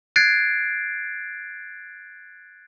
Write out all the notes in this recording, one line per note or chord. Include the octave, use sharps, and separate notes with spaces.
F#6 G#6 A6 C7 D7